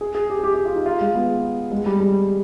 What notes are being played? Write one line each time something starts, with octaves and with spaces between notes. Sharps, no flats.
G#4
G#4
G4
G#4
G4
G4
F4
D#4
F4
G#3
B3
G#3
G3
G3